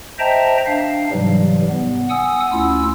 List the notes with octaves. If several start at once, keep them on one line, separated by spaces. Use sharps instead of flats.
C5 D#5 E5 G5 A5 A#5
D4 F5
G#2 C3 E3 F#3 G3
B3
F#5 G#5 D#6 E6
D2 C#4 E4 F4 E6